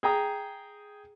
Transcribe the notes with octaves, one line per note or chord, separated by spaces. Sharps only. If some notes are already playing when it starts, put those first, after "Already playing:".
G#4 G5 A#5 D#6